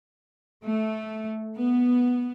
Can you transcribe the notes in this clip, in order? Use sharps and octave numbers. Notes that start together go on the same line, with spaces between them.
A3
B3